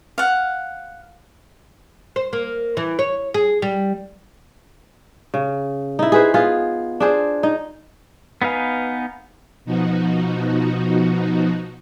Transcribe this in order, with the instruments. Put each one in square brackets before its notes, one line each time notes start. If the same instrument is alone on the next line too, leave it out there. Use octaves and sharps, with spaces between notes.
[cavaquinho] F5 F#5
[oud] C5
A#3
E3
C#5
G#4
G3
[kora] C#3
D#4 E4
G#4 B4 C5
B3 F4 G#4
D4 G#4 C5
D#4
[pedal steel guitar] B3 D#4 B4 F5 G#5
[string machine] B2 F3 D#4 F#4